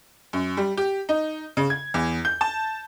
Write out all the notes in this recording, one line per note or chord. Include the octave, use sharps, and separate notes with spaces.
F#2
G3
G4
D#4
C#3
G#6
E2
G6
A5